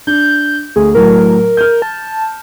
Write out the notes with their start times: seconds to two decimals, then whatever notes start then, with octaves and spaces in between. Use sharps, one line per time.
0.07 D4 G6
0.76 D2 G#4
0.95 A2 F#3 A#4
1.57 F6 G6
1.82 A5